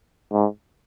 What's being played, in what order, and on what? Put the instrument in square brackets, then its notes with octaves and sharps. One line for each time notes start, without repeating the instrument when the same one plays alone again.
[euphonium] G#2